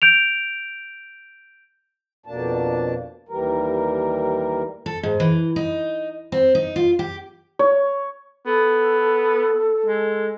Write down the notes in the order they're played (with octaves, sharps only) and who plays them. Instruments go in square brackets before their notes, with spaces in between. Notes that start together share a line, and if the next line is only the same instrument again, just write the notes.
[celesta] G6 D7 F7
[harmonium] F2 B2 A#3 D4 A5
D#2 E3 G3 A#4
[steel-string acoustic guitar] A4
G#2
E3
D#4
C4
D#4
F4
G4
[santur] C#5
[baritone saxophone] B3 [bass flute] A4
[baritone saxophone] G#3